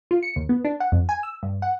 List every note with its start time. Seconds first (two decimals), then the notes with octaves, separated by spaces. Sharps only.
0.11 F4
0.23 C#7
0.36 D#2
0.49 B3
0.65 D4
0.80 F#5
0.92 F2
1.09 G#5
1.23 E6
1.43 G2
1.62 F#5